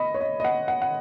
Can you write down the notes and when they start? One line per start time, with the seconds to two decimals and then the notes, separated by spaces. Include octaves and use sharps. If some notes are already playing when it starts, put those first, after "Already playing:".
Already playing: D#5 B5
0.14 C#5
0.21 D#5
0.40 D#5
0.45 F#5
0.68 F#5
0.82 F#5